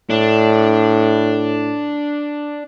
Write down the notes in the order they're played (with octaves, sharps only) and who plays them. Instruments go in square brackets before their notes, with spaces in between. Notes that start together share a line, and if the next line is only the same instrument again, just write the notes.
[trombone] A2 [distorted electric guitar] D4